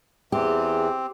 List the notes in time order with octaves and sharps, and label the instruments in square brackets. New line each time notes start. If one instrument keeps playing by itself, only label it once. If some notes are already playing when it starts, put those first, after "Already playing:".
[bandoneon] E2 E3 [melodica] C4 [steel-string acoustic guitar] G4 [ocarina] G#4